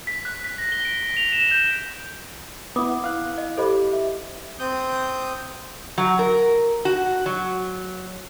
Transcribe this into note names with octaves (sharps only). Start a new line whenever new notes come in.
B6
F#6
B6
A#6
G7
D7
F7
E7
G6
B3 E4 F#5 B5 D6 D#6
E4 F5 F#6
D#5
G4 A4 C5 D#5 B5 D6
E5
C4 D#6 G6
F#3
A#4
F#4
F#3